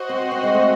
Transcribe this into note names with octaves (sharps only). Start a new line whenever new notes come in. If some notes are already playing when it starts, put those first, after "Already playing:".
Already playing: F#4 C5 D#5
C4
C4
G#3
A3